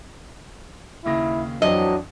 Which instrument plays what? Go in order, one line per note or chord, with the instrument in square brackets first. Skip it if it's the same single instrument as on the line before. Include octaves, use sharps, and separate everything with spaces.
[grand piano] D#2 C#3 A#6 [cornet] E4
[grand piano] F2 E3 C4 [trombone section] F#3 [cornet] D4 [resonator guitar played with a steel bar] D#5